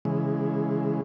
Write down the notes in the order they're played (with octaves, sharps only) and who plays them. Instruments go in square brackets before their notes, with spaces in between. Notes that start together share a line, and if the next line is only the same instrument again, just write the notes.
[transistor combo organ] C#3 E3 G#3